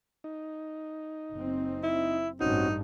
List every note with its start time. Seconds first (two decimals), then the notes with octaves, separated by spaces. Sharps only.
0.24 D#4
1.34 F#1 C4
1.83 E4
2.41 A1 G2 C4 C#4 D#4 F#4